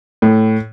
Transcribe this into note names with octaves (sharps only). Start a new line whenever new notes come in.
A2